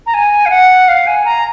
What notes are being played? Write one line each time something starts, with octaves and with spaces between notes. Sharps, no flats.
A#5
G#5
F5
F#5
F5
G#5
A#5